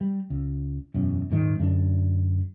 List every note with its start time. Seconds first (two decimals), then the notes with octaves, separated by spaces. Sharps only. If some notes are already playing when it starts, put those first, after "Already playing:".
0.01 G3
0.30 C#2
0.94 E1 F#2
1.30 D#1 G#2 D#3
1.60 F#2 D3 C4 D4